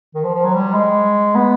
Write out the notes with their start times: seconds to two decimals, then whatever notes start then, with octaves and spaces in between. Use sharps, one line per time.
0.15 D#3
0.24 F3
0.35 F3
0.44 F#3
0.54 G3
0.74 G#3
1.35 B3